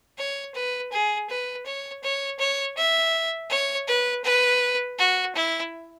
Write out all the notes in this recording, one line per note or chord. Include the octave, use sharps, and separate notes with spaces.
C#5
B4
G#4
B4
C#5
C#5
C#5
E5
C#5
B4
B4
F#4
E4